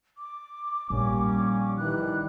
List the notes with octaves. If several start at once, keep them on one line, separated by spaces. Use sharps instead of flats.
D6
A#1 G3 A#3 C#4
D#3 E3 G3 F#6